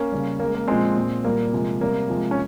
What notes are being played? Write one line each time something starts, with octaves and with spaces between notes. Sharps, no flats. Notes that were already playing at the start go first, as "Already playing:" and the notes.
Already playing: A#3 C#4
C#3 G3
C#3 G#3 A#3
A#3
A#2 F3 G#3 C4
A#2 G#3
A#2 G3 A#3
C3 F3 G#3
C3 G3 A#3
C3 F3 G#3
C#4